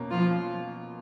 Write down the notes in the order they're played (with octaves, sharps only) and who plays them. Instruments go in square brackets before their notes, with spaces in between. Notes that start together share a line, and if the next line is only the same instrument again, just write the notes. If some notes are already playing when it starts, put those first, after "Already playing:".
Already playing: [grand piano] B2 A#3 C#4
[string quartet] F3 F4